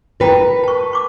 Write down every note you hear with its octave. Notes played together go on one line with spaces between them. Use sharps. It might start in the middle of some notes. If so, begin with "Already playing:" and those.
E4 A#4 B4 G5 A#5
A5 C#6
C#6 D6